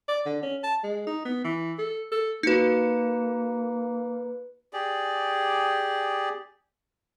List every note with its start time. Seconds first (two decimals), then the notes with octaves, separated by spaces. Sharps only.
0.08 D5
0.26 D3
0.43 C#4
0.63 A5
0.83 G#3
1.07 D#4
1.25 B3
1.44 E3
1.78 A4
2.11 A4
2.43 A#3 D#4 F#4 B4 C#7
4.73 G4 G#4 D5